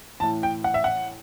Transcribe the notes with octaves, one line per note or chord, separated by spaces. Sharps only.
A2 E3 A5
G5
F#5
E5
F#5